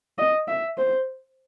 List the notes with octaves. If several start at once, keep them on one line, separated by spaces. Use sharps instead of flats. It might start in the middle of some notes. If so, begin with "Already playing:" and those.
D#5
E5
C5